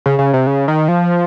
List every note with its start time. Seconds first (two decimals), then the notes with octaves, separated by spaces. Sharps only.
0.06 C#3
0.19 C#3
0.33 C3
0.47 C#3
0.68 D#3
0.88 F3